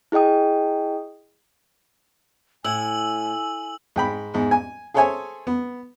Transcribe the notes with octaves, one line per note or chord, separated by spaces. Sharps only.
E4 G#4 D#5 G5 D#6
A2 G#5 E6 F#7
G#2 G5 B5
E2 G#2
G#5
G#4 A4 C5 C#5 E5 G#5
B3